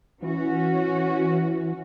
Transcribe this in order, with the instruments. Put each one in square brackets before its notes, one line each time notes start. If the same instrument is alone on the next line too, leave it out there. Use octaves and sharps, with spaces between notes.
[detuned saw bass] E3 [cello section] C#4 F#4